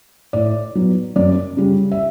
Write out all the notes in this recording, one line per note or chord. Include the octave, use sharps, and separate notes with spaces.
A2 D5
F#3 B3
F#2 D5
C#3 G3 C#4
E5